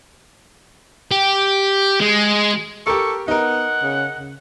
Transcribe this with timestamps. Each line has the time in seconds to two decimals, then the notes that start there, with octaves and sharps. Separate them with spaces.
1.12 G4
2.00 G#3
2.87 G4 A4 A#4 C#6
3.28 B3 D#4 A#4 F#5
3.83 C#3
4.18 C#3